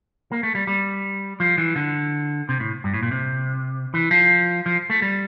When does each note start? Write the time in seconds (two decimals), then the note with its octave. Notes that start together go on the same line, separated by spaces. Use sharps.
0.32 A#3
0.43 A3
0.55 G3
0.67 G3
1.40 F3
1.58 E3
1.76 D3
2.49 C3
2.60 A2
2.84 G2
2.94 A2
3.03 A#2
3.11 C3
3.94 E3
4.11 F3
4.66 F3
4.90 A3
5.02 G3